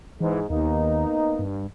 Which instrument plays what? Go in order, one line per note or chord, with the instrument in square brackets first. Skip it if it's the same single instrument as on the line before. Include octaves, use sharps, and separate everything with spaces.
[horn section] G#2 [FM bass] E3
[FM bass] D#2 [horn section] A#3 B3 D#4
[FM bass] G2